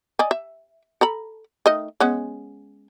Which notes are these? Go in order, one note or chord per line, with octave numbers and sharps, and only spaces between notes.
D5 D#5 G#5
E5
A4 A#5 B5
D#3 A3 D#5
G#3 B3 C#4